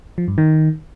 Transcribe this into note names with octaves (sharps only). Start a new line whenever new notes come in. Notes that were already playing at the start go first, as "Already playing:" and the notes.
F3
G2
D#3